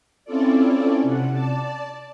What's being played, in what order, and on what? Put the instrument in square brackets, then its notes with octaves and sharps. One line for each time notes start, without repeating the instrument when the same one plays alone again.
[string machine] C4 C#4 E4 F4 A4 D5
C3 F#5
D5 A5